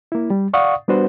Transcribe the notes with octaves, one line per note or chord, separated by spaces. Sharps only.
A#3 E4
G3
D5 F5 F#5 C#6 D#6
G3 B3 D4 F#4 B4 C5